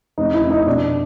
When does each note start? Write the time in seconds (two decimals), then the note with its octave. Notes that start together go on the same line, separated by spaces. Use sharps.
0.18 F1 D#4
0.34 E4
0.42 F1
0.50 D#4
0.67 B2 D4